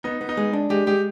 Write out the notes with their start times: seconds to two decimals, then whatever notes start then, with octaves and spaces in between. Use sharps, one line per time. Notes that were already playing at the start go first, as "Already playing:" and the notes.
0.04 B3 D#4
0.21 B3
0.29 D#4
0.37 G#3
0.53 D4
0.70 G#3 G4
0.87 G#3 G4